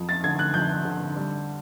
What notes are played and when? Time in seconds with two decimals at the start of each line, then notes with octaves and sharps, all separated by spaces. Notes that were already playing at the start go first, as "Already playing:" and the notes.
Already playing: F2
0.09 A6
0.24 D3 G#6
0.39 F#6
0.54 F2 G6
0.85 D3
1.16 G3